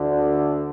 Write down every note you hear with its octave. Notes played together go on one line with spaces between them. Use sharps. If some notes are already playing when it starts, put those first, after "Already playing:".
Already playing: D2 D3